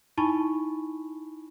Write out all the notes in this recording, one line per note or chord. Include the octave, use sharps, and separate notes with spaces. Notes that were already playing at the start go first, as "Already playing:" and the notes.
D#4 E4 G#5 A5 B5 C#6